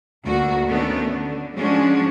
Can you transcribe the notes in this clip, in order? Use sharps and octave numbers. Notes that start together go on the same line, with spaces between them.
D2 A#3 F#4
D#3 A3 B3 C#4 D4
D3
F3 G#3 C#4 D4 F#4